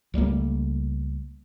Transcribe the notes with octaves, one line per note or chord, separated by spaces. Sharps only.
C#2 G3 A3 A#3